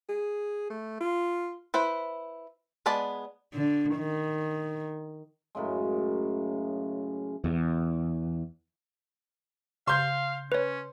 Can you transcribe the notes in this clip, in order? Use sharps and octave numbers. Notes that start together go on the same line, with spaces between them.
G#4
A3
F4
E4 B4 C5
G#3 B3 B4 D5 A5
D3
D#3
F#2 A2 C#3 G#3
E2
C#3 F5 C6 G6
C#4 B4 C#5